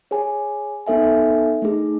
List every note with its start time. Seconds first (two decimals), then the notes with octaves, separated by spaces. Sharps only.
0.11 G#4 C#5 G#5
0.87 B3 D#4 A4 E5 G#5
1.62 A3 D#4 G#4